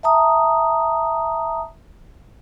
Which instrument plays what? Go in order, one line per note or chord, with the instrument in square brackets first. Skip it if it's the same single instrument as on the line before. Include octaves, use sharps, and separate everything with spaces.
[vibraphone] E5 A5 A#5 D#6